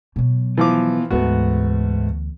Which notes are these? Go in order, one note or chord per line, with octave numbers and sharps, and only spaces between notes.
B2 F#3
E3 F3 B3 D6
D2 G#2 E3 A3 B3 F#4